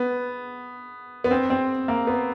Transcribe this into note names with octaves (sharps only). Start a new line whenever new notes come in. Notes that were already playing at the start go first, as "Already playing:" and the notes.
Already playing: B3
B3
C4
C4
A#3
B3